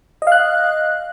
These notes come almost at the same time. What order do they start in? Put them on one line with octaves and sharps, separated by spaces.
D#5 F5 F#6